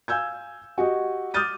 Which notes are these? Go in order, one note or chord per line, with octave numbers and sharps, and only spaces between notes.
F5 G#5 E6 G6 G#6
F#4 G4 D#5
D6 D#6 F6 G6 A6 D#7